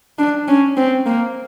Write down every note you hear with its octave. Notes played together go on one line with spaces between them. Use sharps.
D4
C#4
C4
A#3